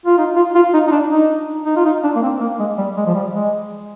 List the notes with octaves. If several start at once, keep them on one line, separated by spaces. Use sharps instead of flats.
F4
D#4
F4
F4
D#4
D#4
D4
D#4
D#4
F4
D#4
D4
A#3
C4
A#3
G#3
G3
G#3
F3
G3
G#3